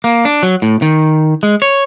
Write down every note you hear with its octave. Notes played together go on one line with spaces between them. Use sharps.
A#3
D4
F#3
A2
D#3
G#3
C#5